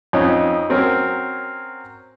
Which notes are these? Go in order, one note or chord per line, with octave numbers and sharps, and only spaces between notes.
F2 C#4 D#4
F#3 C4 C#4 A#4